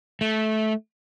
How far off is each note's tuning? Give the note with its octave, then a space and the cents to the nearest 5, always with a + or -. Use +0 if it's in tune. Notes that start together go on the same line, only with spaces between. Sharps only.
A3 -15